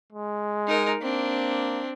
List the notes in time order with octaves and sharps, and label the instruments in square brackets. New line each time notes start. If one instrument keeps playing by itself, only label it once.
[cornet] G#3
[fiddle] D#4 A#4
[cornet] A#3 [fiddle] C4 D4